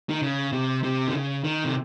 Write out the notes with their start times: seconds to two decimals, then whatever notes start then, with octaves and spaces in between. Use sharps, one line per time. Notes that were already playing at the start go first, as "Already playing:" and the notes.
0.10 D#3
0.22 C#3
0.53 C3
0.83 C3
1.08 D#3
1.13 C#3
1.44 D#3
1.65 C3